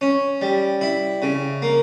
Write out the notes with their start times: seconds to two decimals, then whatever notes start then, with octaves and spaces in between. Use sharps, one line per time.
0.01 C#4
0.42 G3
0.81 E4
1.22 C#3
1.62 A#3